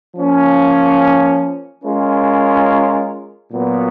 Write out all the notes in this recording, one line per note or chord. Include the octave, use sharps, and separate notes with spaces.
F3 A#3 C#4
G#3 C#4 F4 A#4
A#2 F#3 B3 F#4